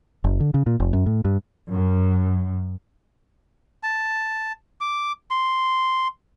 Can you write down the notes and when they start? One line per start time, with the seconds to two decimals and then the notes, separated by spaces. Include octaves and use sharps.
0.24 F#1
0.40 D3
0.54 C#3
0.66 A#2
0.80 F1
0.93 F#2
1.06 A2
1.25 G2
1.71 F#2
3.83 A5
4.81 D6
5.30 C6